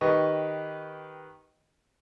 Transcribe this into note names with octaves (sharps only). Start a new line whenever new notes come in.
D#3 G4 B4 D#5 C#6